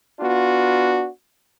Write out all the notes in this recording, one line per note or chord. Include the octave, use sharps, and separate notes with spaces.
B3 D4 F4 F#4